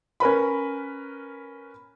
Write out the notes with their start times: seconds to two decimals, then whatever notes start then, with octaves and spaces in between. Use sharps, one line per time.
0.20 C#4 A#4 B4 B5